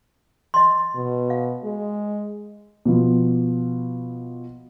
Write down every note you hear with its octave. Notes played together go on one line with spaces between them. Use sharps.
D#5 C6
B2
F5
G#3
B2 F3